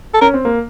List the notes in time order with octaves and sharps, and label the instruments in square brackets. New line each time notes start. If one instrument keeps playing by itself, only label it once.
[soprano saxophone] A4
[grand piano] C#4 [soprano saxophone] A#4
[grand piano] C4
A#3